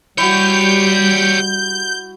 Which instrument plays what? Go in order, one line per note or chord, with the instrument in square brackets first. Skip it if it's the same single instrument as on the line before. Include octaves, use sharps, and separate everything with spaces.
[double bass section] G3 [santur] E4 F#4 [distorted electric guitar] G4 C#5 [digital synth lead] G6